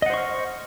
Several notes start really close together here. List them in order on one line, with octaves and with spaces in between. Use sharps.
D#5 F#5 C5 C#6 F6